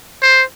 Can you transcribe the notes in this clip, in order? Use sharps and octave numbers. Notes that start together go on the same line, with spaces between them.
C5